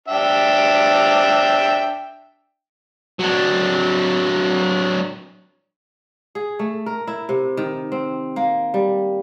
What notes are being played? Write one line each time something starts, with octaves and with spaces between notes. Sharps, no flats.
D4 E5 G5
F#3 D4
G#4
A3
A#4
E4
C3
D#3
C4
A#3
G3